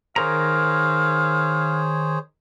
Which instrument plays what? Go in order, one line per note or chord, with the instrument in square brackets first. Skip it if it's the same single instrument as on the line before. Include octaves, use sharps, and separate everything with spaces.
[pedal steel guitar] D#3 A#4 A#5 [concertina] G#4 C5 C#5 [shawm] F5